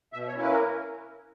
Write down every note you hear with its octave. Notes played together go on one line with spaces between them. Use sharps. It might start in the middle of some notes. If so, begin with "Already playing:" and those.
B2 E5
C#5
A#3 C#4 E4
B4
A#4